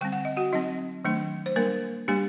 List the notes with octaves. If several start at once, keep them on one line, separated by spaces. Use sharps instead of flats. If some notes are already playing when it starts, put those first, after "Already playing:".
D3 G3 C4 G5
F#5
D#5
F#4 F#5
F#3 C4 D#4 D#5
D#3 F#3 A3 D4
C5
G3 A#3 D4 A#4
G3 A#3 D4 G4